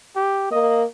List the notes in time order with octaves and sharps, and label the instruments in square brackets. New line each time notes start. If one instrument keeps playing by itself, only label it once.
[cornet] G4
[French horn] A#3 [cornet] D#5